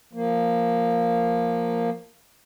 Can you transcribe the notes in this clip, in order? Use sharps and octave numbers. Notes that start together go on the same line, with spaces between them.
F3 A#3